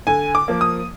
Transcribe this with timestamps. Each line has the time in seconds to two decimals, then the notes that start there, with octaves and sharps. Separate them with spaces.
0.07 D3 G#5
0.35 D6
0.48 F3 A#3
0.61 D#6